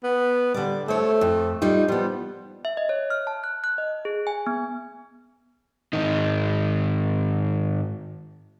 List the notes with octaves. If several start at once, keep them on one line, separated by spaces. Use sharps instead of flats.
B3
D3 G3 D5
A3 C5 C#5
F2
G3 D#4 F4
F3 G3 B3
E5
D#5
C#5
F6
A5
F#6
F#6
D#5
G#4
G#5
B3
G#2 D#3 D#4